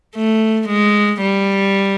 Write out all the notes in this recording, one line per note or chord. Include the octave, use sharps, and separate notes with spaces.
A3
G#3
G3